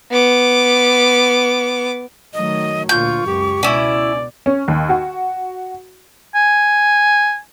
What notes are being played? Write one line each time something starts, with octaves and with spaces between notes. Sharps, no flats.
B3 D6
D#3 F#3 A3 D#5
D2 A#2 F4 C#6 G6
C#2 F#2 G4
B2 C#4 E4 D5
C#4
D#2
F#4
G#5